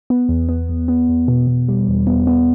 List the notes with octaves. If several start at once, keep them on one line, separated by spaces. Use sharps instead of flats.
B3
E2
B3
E2
B3
E2
B2
B2
G3
E2
B3
B3